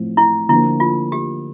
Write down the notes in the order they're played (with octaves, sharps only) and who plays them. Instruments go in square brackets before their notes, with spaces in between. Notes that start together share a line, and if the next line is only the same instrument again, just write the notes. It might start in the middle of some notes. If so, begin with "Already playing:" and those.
Already playing: [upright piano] A2 F3 C4
[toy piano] E4
[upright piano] D3 F3 A#3 [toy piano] E4
[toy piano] F4
G4